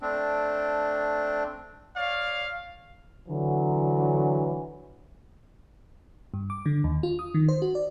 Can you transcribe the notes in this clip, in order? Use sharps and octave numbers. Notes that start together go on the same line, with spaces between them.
A3 C4 D4
C#5 D5 F5
D3 E3 F#3
G2
D6
D3
D#2
F4
D#6
D#3
C5
F#4
D5